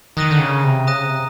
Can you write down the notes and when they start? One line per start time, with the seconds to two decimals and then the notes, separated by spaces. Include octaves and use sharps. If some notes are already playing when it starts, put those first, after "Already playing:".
0.17 D#3 A#5 D#6 F#6 A#6 D#7
0.31 D3
0.39 C#3
0.64 C3
0.87 C#3 A#5 D#6 F#6 A#6 D#7
1.04 C3